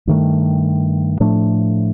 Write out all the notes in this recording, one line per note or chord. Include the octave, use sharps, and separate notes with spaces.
G2 D#3 A3
A2 F3 A3 D4